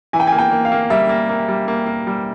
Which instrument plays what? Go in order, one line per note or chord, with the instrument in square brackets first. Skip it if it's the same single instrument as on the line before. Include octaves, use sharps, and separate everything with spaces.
[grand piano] E3 [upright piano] G#5
[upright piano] G5
G#5
[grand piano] A#3
[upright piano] G5
[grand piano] A#3
[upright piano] F5
[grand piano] A#3
[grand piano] G3 [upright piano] E5
[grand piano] A#3
A#3
G3
A#3
A#3
G3